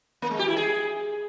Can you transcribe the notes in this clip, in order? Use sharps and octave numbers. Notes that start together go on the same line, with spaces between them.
A#3
G#3
G4
E4
G#4